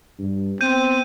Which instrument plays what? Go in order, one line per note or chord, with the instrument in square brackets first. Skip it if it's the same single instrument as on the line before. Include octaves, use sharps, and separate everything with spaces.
[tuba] G2
[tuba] B3 [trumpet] C4 [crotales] G6 D#7